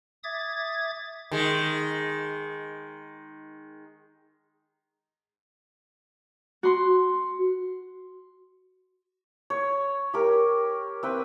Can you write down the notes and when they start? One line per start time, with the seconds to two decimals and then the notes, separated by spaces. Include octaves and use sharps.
0.24 E5 D6 D#6 G#6 A6
1.31 D#3 G#3
6.63 F#4 C6
9.50 C#5
10.14 G4 A#4
11.03 C4 B4 G5